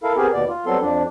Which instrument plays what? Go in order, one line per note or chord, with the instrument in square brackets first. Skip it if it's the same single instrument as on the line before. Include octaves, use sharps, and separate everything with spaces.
[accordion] E4 A4 A#4 F5
B3 C4 G4 G#4 A#4
D#2 B2 B3 D5
F4
F#3 G3 B3 C4 A4 C6
F2 F3 D4